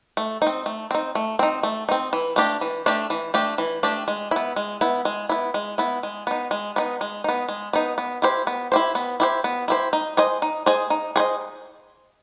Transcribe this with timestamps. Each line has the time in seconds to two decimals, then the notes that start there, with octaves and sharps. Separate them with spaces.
0.17 A3
0.42 C4 D#4
0.66 A3
0.91 C4 D#4
1.15 A3
1.39 C4 D#4
1.63 A3
1.89 C4 D#4
2.13 E3
2.36 A3 D4 G4
2.61 E3
2.86 A3 D4 G4
3.10 E3
3.34 A3 D4 G4
3.58 E3
3.83 A3 D4 G4
4.08 G#3
4.31 B3 E4
4.56 G#3
4.81 B3 E4
5.05 G#3
5.29 B3 E4
5.54 G#3
5.78 B3 E4
6.03 G#3
6.27 B3 D#4
6.51 G#3
6.76 B3 D#4
7.01 G#3
7.24 B3 D#4
7.48 G#3
7.73 B3 D#4
7.98 B3
8.22 E4 G4 C5
8.47 B3
8.72 E4 G4 C5
8.95 B3
9.20 E4 G4 C5
9.44 B3
9.68 E4 G4 C5
9.93 D#4
10.17 G#4 C5 D#5
10.42 D#4
10.66 G#4 C5 D#5
10.90 D#4
11.16 G#4 C5 D#5